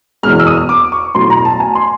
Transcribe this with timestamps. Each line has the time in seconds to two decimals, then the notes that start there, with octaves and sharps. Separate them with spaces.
0.23 F#1 E2 B2 G#3 F6
0.39 E6
0.47 D#6
0.69 D6
0.92 C#6
1.15 B1 A2 F#3 C6
1.30 A#5
1.45 A5
1.60 G#5
1.75 C6